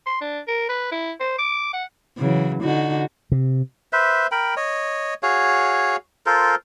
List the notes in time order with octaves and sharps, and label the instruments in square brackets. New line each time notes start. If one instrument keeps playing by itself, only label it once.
[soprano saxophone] C6
D4
A#4
B4
E4
C5
D6
F#5
[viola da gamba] C#3 E3 F#3
D3 D#4 F#4
[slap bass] C3
[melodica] B4 C5 E5
A#4 G5 B5
C#5 D#5
F#4 G#4 C#5 F5
F4 A4 A#4 C5